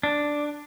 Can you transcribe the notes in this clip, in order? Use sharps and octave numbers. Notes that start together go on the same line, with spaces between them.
D4